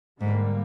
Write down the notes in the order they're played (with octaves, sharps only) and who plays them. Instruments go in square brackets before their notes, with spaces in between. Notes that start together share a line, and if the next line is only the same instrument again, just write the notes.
[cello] G#2 [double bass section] D3 G3 A#3